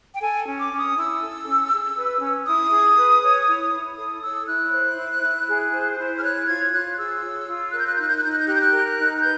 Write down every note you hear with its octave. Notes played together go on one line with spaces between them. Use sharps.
G5
A4 G#5
C#4
D6
C#4
D#6
E4 E6
A4
C#4
G#4
B4
C#4
E4 D#6
G#4
B4
C#5
E4
E4
A4 D#6
C#5 E6
E4 F#6
C5
E4
E4
G#4
C5
E4
F6
C#5 F#6
F4 G#6
F4 F#6
G#4 E6
C#5
F4
A#4 F#6
G6
F#6
G6
D#4 F#6
G6
F#6
D#4 G6
F#6
G6
G4 F#6
G6
F#6
A#4
D#4
F#6
B4 G6